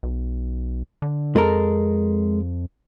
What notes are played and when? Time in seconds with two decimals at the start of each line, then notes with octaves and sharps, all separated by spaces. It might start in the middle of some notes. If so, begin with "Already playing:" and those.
0.03 B1
1.02 D3
1.36 F2 G#3 A4 A#4